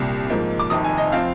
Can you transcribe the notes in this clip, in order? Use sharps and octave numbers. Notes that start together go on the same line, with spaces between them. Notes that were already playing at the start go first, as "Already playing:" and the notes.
Already playing: C2 A#2 G3
G#2 F3 A#3 D#4
D6
F1 F2 C3 D#3 D#6
G#5
D#5
F3 C4 F5